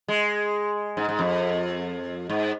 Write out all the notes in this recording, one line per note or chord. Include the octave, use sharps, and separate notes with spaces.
G#3
G#2
G#2
F2
G#2